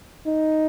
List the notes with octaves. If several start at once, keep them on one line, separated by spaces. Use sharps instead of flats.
D#4